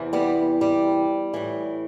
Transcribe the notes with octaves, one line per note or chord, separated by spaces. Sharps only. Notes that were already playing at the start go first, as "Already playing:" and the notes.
Already playing: E2 C3 E3
G3 B3
G3
A2 E3